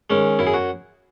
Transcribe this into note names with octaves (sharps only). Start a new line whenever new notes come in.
D#3 G#3 C#4
F#2 E4
G#4
F#4